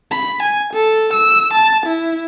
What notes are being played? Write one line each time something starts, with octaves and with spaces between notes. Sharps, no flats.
B5
G#5
A4
E6
A5
E4